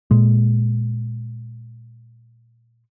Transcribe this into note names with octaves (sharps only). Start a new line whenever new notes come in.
A#2 G#3